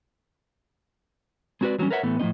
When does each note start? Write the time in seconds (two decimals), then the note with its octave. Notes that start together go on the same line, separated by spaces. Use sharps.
1.61 G#3 C4 F#4 G4 B4 D5
1.78 E3 F#3 G3 A#3 C#4
1.91 A#4 B4 C#5 E5 F#5
2.03 A2 E3 A3 B3
2.20 A2 F3 G#3 C4 D#5